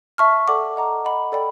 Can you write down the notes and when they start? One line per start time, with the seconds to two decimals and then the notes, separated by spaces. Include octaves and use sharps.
0.18 E5 A5 C#6 F6
0.47 A4 D5 F#5 A5 D6
0.76 D#5 F#5 A#5 D6
1.05 D#5 F#5 B5
1.32 A4 D5 G5 B5